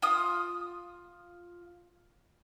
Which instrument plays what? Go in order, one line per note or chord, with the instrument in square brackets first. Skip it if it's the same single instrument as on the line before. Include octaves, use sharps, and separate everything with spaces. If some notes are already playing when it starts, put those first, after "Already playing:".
[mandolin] F4 D#6